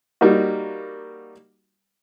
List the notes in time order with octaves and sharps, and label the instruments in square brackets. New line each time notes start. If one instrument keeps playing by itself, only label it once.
[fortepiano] G3 A#3 D#4 F#4